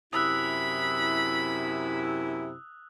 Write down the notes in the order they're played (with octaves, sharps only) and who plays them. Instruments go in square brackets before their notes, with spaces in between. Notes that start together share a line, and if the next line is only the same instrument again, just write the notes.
[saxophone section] F#2 C3 E4 [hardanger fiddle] B5 [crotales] D#6 E6 F#6